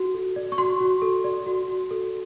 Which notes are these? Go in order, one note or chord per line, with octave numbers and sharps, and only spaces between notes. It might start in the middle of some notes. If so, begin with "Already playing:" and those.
Already playing: F#4
A4
D5
C#6
F#4 C6
F#4
A4
D5
F#4
F#4
A4